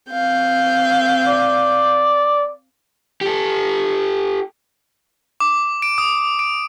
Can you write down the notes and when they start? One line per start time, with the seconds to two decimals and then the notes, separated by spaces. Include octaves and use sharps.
0.11 C4 F5 G6
1.27 D5
3.21 G4 A4
5.40 D6
5.82 D7
5.98 D#6
6.39 D7